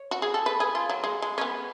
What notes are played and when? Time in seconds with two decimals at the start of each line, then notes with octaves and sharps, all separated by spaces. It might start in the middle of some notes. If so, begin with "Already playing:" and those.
Already playing: C#5
0.11 F#4
0.22 G#4
0.34 A4
0.46 B4
0.60 G#4
0.75 F4
0.89 F#3
1.04 G#3
1.22 G#3
1.38 C#4
1.41 B3